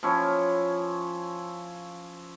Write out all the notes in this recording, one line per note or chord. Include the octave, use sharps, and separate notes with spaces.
F3 C#4 E4 C#5